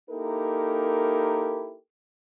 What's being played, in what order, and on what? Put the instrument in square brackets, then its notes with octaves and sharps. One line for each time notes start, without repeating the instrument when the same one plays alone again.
[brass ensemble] A#3 D#4 E4 G4 A4 A#4